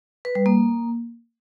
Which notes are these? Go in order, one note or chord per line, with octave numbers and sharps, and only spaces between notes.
B4
G3
A#3